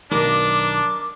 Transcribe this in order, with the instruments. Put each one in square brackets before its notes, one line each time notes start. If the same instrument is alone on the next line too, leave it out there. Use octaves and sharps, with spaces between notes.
[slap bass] B1 D#3 [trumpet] D4 [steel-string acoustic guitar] A#4 D#5 [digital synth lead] D6